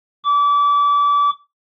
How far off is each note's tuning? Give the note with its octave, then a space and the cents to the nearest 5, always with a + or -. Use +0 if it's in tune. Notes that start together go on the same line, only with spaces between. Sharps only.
D6 -30